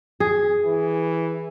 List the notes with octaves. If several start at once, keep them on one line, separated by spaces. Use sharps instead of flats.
G#4
E3